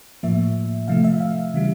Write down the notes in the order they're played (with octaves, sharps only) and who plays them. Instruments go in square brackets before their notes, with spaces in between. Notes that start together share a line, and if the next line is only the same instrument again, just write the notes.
[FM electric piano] A2 F3 A#3 E5
C3 F3 A3 F5
E5
F5
C#3 E3 G3